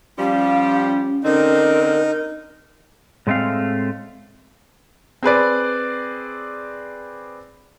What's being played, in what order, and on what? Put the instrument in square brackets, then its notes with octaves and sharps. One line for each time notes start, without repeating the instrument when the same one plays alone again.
[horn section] F3 G3 G4 [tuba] C#4 [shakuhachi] F5
[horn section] D3 C4 [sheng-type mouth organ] D#4 [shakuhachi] A#4
[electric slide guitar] A2 G#3 A3 C4 F5
[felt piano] C4 G#4 B4 D5